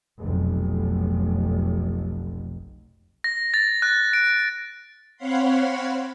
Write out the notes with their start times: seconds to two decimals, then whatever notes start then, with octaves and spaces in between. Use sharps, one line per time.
0.19 F1 B1
3.24 A#6
3.54 A6
3.82 F#6
4.13 D7
5.16 C4 C#5 F5 F#5 B5 C6